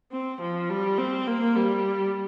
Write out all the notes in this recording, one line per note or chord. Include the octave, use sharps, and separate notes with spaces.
C4
F3
G3
C4
A#3
G3